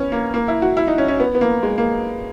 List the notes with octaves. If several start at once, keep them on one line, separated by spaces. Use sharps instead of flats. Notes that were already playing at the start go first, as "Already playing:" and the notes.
Already playing: B3 C#4
A#3
A#3
E4
F#4
E4
D#4
C#4
C#4
B3
B3
A#3
G#3
A#3